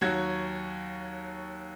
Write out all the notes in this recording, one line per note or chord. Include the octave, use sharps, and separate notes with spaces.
D#2 F#3 F#4 C#5 G#6